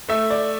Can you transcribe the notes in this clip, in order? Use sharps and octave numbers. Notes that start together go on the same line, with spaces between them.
A3 E5
D5